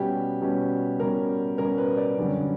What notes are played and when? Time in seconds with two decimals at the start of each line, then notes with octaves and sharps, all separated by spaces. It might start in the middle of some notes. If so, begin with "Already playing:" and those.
Already playing: B2 G3 C#4 G4
0.41 B2 G3 C#4
1.00 B2 G3 C#4 A#4
1.58 B2 G3 C#4 A#4
1.78 B4
1.97 D5
2.17 F#2 D3 G3 C#4